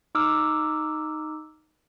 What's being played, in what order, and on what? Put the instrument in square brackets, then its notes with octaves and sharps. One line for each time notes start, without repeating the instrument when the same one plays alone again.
[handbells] D#4 D6 E6 F6